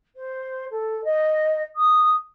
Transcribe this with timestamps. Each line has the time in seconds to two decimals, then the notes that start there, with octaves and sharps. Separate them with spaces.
0.16 C5
0.71 A4
1.04 D#5
1.76 D#6